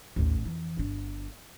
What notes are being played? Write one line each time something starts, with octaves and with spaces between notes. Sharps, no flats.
A1 D#2
F2 E3
G1 D4